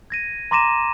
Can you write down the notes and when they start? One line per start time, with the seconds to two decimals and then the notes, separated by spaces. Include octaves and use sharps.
0.10 G#6 A#6 D#7
0.51 A#5 C6 D6 A#6 D#7 E7